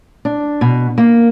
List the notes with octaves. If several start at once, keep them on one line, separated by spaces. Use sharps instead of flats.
D4
B2
A#3